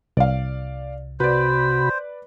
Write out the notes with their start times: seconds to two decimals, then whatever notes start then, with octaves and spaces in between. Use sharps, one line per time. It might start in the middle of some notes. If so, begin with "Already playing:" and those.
0.17 C2 D5 F5
1.20 C3 F#4 B4 C5 D5 B5